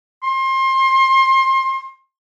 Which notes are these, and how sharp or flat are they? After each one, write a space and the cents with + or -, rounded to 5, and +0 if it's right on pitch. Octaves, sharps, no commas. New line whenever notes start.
C6 +30